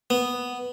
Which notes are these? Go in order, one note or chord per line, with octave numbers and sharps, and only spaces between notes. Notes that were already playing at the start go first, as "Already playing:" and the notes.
B3